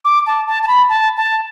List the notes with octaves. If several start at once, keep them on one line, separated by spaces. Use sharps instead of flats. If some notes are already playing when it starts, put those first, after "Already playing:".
D6
A5
A5
A5
B5
A5
A5